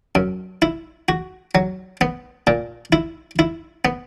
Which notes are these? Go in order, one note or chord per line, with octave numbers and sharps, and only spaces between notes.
F#2
E4
F#4
F#3
B3
A#2
E4
E4
B3